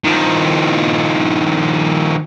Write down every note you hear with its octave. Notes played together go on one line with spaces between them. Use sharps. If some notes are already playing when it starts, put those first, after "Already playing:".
D#3 F3